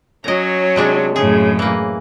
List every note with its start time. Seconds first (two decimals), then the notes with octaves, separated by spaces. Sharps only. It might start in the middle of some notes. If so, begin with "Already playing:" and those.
0.24 F#3 C#4 D#5 A#5
0.76 C3 G#3 D4
1.16 F#2 A2 C#3 G#4
1.59 E3 A#3